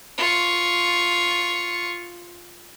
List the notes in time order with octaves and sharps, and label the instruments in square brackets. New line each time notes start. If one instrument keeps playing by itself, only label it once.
[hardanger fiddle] F4 C#6